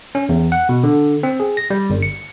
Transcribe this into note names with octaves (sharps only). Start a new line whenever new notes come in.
C#4
E2
F#5
B2
D3
C4
G#4
A#6
G3
G1
C#7